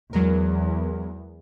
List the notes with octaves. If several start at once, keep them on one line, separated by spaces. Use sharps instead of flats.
E2 F#3 G#3 A#4